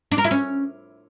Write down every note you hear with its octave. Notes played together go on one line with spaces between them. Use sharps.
D4
A#4
E4
C#4